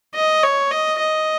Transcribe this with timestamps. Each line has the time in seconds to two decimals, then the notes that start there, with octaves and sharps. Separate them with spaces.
0.15 D#5
0.43 C#5
0.71 D#5
1.00 D#5